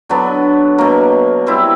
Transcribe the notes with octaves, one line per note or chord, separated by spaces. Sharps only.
D3 F#3 B3 D4
B2 F#3 A#3
G3 C4 E4